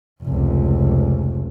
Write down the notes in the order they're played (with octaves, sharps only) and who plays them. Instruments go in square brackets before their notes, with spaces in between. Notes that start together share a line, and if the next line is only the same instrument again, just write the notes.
[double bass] F1 C#2